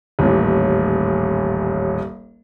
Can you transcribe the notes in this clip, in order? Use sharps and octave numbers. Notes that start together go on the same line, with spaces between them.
D#1 A1